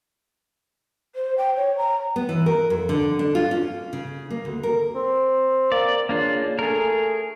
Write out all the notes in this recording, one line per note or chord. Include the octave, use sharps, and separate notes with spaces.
C5
G5
C#5
A#5
B3
E3
A#4
F2
D3
D4
F4
C#4
C#3
A#3
D2
A#4
C4
A#3 D5
C#3 A#3 D4 F4
A3 G#4 A#4